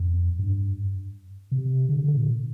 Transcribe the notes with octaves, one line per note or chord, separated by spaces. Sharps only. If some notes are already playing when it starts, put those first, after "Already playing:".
Already playing: F2
G2
C3
D3
D3
A#2